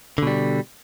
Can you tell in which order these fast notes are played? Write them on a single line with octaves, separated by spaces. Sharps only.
D3 B2 G3